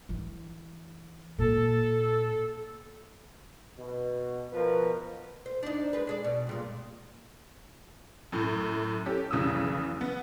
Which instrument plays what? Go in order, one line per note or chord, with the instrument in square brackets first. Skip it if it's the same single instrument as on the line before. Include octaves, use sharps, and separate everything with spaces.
[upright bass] E3
[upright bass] A#2 [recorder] A4
[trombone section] B2
B2 F3 A#4 B4
[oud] C5
D4 D#4
G#3 B4
D4 G#4 D5
B2
G2 A#2 G#3
[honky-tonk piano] F#2 A2
C#4 G4 A4
F1 B1 C#3 E3 D#6 E6
B3